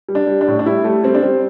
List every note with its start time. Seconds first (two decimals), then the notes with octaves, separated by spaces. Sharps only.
0.09 G3
0.15 D4
0.27 G3
0.41 D4
0.47 A2
0.59 D4
0.66 G3 E4
0.84 G3 A3
1.03 G3 C4
1.15 D4
1.22 G3 C4